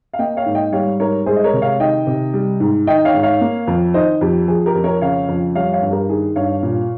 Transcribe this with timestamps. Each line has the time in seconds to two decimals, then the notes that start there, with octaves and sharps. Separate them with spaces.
0.13 F5
0.19 A#3 D#5 G5
0.37 C#5 F5
0.46 G#2
0.55 D#5 G5
0.72 G3 C#5 F5
1.00 G#2 A#4 C#5
1.26 G#3 G#4 C5
1.36 D#5
1.44 A#4 C#5
1.53 C3
1.62 C#5 F5
1.80 D#3 D#5 G5
2.07 C3
2.34 G3
2.60 G#2
2.87 D#3 D#5 G5
3.05 C#5 F5
3.14 G#2
3.23 C#5 F5
3.41 A#3
3.67 F2
3.94 D#3 C5 D#5
4.21 F2 G4
4.48 F3 G#4
4.66 G4 A#4
4.75 F2
4.84 A#4 C#5
5.01 C#3 C#5 F5
5.28 F2
5.55 G3 C#5 F5
5.73 C#5 F5
5.82 G2
5.91 G4 A#4
6.09 D#3 G#4
6.36 G2 C#5 F5
6.63 A#2